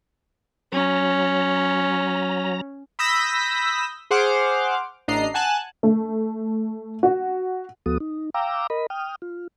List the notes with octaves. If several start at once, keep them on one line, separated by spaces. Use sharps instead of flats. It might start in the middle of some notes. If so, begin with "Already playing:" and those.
F#3 C#4 A#5
B5 D#6 E6 G6 A#6 B6
G#4 C5 F#5 C6 D6 F6
A1 D4 D#5 A#5 C7
F#5 G#5 A5 F#6
A3
F#4
D2 F3 B3 F#4 A4 D#6
D#4
F5 G5 A#5 D6 E6
A#4 D#5 B5
G5 D#6 F6
F4